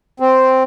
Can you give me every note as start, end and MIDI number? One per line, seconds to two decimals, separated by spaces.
0.20 0.63 60